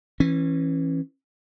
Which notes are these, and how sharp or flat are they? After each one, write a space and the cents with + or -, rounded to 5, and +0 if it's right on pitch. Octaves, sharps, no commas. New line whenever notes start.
E3 +0 C#4 -30